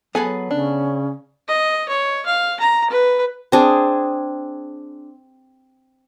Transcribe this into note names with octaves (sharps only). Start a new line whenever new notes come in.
F#3 B3 G#4 A4 B4 G#5
C#3 C#4 D4
D#5
C#5
F5
A#5
B4
C4 D4 G#4